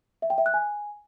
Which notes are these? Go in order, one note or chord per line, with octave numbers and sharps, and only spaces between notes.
E5
G5
E5
F#6
G#5